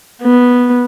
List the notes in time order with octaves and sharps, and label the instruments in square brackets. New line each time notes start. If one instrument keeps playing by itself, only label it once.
[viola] B3